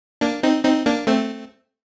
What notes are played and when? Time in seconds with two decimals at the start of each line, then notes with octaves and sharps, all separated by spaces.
0.21 A#3 D4
0.43 C4 D#4
0.64 C4 D#4
0.86 A#3 D4
1.07 A3 C4